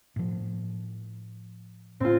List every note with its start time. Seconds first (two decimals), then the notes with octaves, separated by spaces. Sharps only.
0.16 A2 F3
2.00 A2 C4 F4